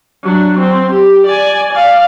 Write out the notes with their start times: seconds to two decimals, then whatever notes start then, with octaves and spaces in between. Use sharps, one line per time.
0.23 F#3 D4
0.60 C4
0.93 G4
1.27 D5 G#5
1.73 D5 F5